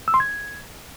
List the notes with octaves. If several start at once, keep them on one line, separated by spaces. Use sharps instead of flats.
E6
C6
G#6